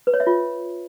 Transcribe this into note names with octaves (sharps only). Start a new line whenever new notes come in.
B4
C#5
E5
F4